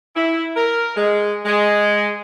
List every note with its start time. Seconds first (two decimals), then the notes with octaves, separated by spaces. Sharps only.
0.16 E4
0.56 A#4
0.96 G#3
1.45 G#3